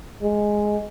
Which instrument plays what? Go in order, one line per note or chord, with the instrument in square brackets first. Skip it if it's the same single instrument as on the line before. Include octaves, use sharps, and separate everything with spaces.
[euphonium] G#3